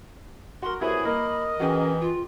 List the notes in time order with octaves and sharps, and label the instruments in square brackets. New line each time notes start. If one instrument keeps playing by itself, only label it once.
[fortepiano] F#4 A#4 [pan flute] C6
[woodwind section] C2 F#2 G#4 [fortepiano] E4 F#4 B4 [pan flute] B5
[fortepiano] A#3 [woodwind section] A#4 D#5
[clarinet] E3 [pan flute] C#4 [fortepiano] F#4 G#4 G5
[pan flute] F4